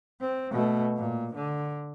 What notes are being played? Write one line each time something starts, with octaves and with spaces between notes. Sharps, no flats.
C4
B2 A3
A#2
D3